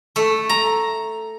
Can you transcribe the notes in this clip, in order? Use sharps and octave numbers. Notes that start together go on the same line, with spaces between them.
A3
A#5